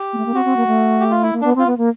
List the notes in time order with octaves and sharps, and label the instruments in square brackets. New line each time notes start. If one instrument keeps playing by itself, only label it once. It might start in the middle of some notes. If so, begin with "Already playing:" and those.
Already playing: [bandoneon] G4
[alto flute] A#3
A3
A#3
[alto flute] C4 [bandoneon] F#4
[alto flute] C4
A#3
A3
[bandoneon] G4
F4
E4
[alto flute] A#3
[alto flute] B3 [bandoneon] D4
[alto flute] C4 [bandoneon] F4
[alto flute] B3
A#3